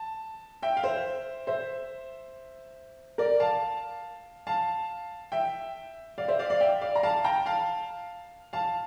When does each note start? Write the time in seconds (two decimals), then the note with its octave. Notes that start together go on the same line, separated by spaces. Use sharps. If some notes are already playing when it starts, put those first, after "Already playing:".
Already playing: A5
0.62 E5 G5
0.77 F5
0.84 C5 E5
1.47 C5 E5
3.18 A#4 D5
3.40 F5 A5
4.47 F5 A5
5.32 E5 G5
6.18 D5 F5
6.28 C5 E5
6.39 D5 F5
6.50 D5 F5
6.60 E5 G5
6.81 D5 F5
6.96 A#5
7.03 F5 A5
7.24 G5 A#5
7.46 F5 A5
8.53 F5 A5